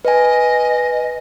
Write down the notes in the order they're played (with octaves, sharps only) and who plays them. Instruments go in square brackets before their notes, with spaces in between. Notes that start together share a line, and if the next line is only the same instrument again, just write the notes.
[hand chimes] B4 G#5 [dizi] D#5